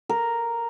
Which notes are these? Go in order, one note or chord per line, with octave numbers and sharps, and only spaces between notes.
A#4